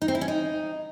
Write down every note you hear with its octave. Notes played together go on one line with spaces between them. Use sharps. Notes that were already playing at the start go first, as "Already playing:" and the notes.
D#4
C4
E4
C#4
D#4